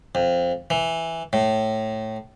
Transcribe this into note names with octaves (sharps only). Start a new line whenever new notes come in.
F2
E3
A2